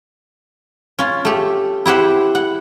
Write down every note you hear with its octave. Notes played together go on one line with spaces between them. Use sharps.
C#4 F4
A3 G4
E4 G4 C5 F#5
F#5